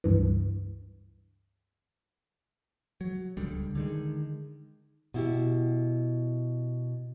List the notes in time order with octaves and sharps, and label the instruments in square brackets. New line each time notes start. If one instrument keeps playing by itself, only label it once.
[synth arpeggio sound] C#2 G2 E3
[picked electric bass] F#3
D1 C#2 D3 G3
D3 D#3 G#3
[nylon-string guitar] B2 E4 G4